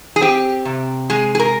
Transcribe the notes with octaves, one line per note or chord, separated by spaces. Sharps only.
G#4
C4 G4
C3
G#3 G#4
G#4
A#4